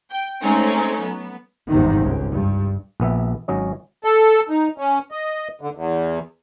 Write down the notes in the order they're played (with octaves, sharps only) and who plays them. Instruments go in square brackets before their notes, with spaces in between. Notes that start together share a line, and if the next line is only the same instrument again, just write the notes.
[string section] G5
G#3 A3 C4 C#4 D#4
F#3 B3
[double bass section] G1 E2 G#2 C3 D#3
C#2
G2
[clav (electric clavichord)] A#1 B3 E5
G#1 F#3 C#4 D#5
[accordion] A4
D#4
C#4
D#5
D3
E2